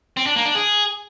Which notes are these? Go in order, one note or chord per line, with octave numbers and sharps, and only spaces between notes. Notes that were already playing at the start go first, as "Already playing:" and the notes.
C4
D4
A#3
D4
G#4